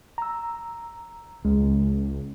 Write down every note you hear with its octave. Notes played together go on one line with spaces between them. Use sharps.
A#5 E6
C#2 G#3